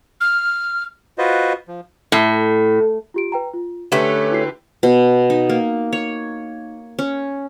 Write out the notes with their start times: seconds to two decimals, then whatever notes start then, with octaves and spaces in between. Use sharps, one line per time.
0.21 F6
1.18 F4 F#4 B4 C5 D#5
1.68 F3
2.12 A2
3.14 F4 G4 D7
3.32 B4 G5 A#5
3.53 F4
3.92 D3 A3 C#4 G4 B4 E7
4.09 F#6
4.32 E4 F#4 C7
4.83 B2
5.30 D#4
5.50 A#3
5.93 C#5
6.99 C#4